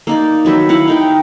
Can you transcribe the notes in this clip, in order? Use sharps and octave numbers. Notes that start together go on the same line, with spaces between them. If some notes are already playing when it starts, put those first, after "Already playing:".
A#3 D#4 D5
D#3 F#3 B4 E5
E4 F5 F#5
D#4 A#4 G5